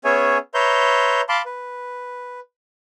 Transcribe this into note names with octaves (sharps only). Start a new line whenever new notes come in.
B3 C#4 G#4 C#5 E5 G#5
B4 C#5 E5 A#5 C6 G6
F5 A5 B5 C6 D6
B4